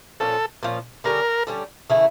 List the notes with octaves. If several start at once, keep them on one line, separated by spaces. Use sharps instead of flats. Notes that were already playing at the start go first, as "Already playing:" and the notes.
A#2 F3 C#4 A4
A#2 F3 C#4
D3 G3 C#4 A#4
D3 G3 C#4
C#3 E3 A3 E4